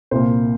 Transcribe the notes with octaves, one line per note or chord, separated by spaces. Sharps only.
C2 A#2 A#3 C5